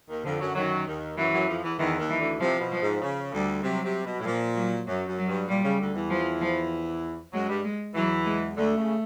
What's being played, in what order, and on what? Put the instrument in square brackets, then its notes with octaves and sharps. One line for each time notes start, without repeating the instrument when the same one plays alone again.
[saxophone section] D#2 D#3
[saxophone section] F2 F3 [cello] D3
[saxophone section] F#2 F#3
[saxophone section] F#2 F#3 [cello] D#3
[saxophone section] D#2 D#3
[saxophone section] F#2 F#3 [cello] E3
[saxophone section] F#2 F#3
F2 F3
E2 E3
[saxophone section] E2 E3 [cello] D#3
[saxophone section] D#2 D#3
[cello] E3
[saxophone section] D2 D3
[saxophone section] C3 [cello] F3
[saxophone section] B2
[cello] F3
[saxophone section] G#2
C#3
[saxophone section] D2 D3 [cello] G3
[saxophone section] C3 [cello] F#3
[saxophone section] C3
B2
A2
[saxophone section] A#2 [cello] F3
[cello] F#3
[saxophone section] F#2 [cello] F#3
[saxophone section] F#2
[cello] F#3
[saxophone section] G2
[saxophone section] A#2 [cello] G3
[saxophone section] C#3
D2 D3
E2 E3
[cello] F3
F3
[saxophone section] F#2 F#3 [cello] G#3
[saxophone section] G2 G3
[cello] G#3
[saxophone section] E2 E3 [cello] F#3
[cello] G#3
[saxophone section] D2 D3 [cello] A3
[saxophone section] C#3